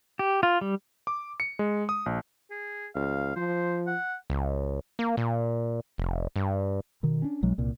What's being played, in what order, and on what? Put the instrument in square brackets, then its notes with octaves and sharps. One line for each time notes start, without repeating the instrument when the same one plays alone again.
[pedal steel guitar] G4
F4
G3
[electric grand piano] D6
C#7
G#3
D#6
A#1
[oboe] G#4
[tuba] C#2 [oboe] F5
[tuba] F3 [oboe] C5
[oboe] F#5
[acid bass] C#2
A#3
A#2
F1
G2
[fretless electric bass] B2 D#3
C#4 D4
B1 F#3 G#3
C2 A#2